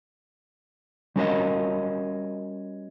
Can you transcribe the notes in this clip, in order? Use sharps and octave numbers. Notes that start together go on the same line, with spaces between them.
G3 C#4 F#4 A#4 C#5 D#5